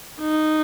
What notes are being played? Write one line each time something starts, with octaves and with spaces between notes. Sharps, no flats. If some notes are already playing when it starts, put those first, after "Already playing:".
D#4